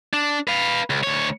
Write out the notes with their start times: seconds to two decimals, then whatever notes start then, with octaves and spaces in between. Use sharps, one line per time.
0.13 D4
0.48 B4 F5
0.90 C#2
1.03 D2 C#5